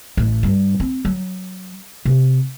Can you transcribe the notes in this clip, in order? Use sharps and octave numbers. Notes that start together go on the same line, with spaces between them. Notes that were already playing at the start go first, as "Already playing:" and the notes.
A1
G2
C4
F#3
C3